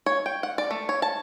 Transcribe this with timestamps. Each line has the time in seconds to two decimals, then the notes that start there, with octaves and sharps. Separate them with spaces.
0.06 C#5
0.26 G5
0.43 F#5
0.58 D5
0.71 A3
0.89 C#5
1.02 A5